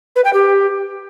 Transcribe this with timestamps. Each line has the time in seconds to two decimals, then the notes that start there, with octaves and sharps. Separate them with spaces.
0.16 B4
0.25 G5
0.33 G4